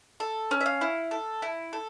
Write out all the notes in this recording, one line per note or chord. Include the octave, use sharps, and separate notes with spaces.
A4
C#4
E5
F5
E4
A4
E4
A4